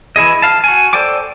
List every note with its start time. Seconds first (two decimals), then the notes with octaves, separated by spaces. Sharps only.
0.16 E3 E4 G#4 D#5
0.42 F5 A5
0.64 F#4 G#5
0.93 A4 C5 D5 G5 D6